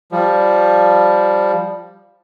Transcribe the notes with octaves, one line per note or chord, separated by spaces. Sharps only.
F3 G3